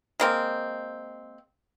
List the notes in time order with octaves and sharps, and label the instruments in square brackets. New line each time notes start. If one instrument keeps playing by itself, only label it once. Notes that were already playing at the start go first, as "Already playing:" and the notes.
[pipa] G#3 A#3 C4